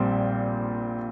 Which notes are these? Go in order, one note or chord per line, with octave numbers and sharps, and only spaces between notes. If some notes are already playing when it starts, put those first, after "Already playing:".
Already playing: A#1 A#2 G3 C4